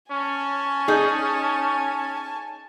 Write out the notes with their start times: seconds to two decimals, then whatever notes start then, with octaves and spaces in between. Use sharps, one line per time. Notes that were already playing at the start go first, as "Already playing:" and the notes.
0.11 C#4 G#5 A5
0.88 D#4 G#4